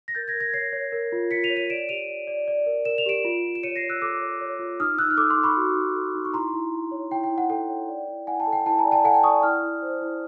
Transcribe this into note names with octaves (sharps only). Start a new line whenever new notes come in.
A#6
A#4 G6 A6
G#6 A#6
A#4
G#6 A#6
C#5 A#6 C7
C#5
A#4
F4
F4 B6 C#7
D#7 F7
C#5
D#7 F7
D5 D7 E7
G4 D#7 F7
D5
D5
D5
A#4
A#4 E7
F7
G4 D7 E7
F4
F4
E7
C#5 C#7 D#7
A#6 C7
C#5
E6 F#6
A4 D6 E6
C#5
C#5
F4
D#4 D#6 F6
D#4 E6 F#6
F6
A4 D6 E6
C6 D6
D#4
B5 C#6
F#4
D#4
A4
D#4
C#6
E4 A#5 C6
E4
E4
C#5
E4 G5
G5
E4
F#5
A4 G5
C#5
D5
E4
E4 F#5 G#5
G5 A5
A4
G5
E4 G5 A5
G#5 A#5
D5
G5 A5
A4 F#5 G#5
G5 A5
D5 C#6 D#6
E4 D#6 F6
E4
C5
E4